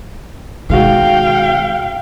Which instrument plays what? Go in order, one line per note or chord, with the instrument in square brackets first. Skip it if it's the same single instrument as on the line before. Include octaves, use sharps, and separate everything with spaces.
[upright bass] B2 [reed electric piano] D#3 G#3 F#4 [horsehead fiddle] F5 G5